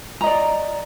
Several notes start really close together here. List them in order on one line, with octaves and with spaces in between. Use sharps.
A#5 D#5 D5